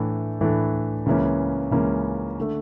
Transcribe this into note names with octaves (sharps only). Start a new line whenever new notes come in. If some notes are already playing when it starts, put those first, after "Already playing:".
Already playing: A2 E3 A3 D4 A4
A2 E3 A3 D4 A4
C#2 C#3 E3 A#3 C#4
C#2 C#3 E3 A#3 C#4
D3 A3